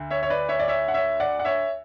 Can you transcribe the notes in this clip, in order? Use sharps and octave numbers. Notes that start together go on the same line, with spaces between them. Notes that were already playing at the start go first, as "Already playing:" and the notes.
Already playing: D2 D3
C#5 E5
C#5
B4 D5
C#5 E5
D5
C#5 E5
F#5
C#5 E5
D5 F#5
F#5
C#5 E5